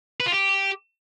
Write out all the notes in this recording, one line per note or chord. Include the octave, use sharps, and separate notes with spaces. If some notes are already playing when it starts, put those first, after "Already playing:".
B4
F4
G4